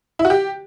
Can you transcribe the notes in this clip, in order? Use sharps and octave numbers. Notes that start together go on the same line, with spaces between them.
E4
F#4
G4